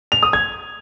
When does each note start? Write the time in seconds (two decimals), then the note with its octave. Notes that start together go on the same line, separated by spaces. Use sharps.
0.12 F7
0.23 D#6
0.33 G#6